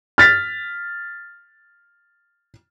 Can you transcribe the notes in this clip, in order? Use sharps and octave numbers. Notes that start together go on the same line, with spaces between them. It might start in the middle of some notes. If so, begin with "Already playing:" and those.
F6 A6 B6